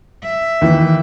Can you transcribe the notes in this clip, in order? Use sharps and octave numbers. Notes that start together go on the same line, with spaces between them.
E5
D#2 E3